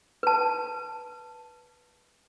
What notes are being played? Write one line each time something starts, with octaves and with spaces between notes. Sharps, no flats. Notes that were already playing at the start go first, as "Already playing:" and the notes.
B4 A5